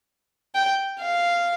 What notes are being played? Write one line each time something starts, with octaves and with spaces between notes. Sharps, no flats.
G5
F5